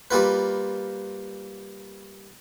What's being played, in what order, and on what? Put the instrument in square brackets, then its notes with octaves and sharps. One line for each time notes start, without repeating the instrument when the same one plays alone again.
[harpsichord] G3 A#3 F4 B4